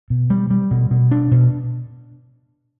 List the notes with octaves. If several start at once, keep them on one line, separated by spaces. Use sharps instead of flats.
B2
G3
G3
B2
B2
D4
B2